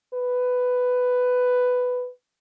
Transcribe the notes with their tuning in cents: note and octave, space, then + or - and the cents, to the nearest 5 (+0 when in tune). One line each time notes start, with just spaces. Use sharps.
B4 +10